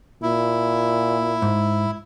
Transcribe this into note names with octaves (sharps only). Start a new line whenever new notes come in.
A#2 E4
G#2